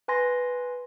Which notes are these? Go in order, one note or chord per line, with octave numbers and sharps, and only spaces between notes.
B4 G#5 C6 A#6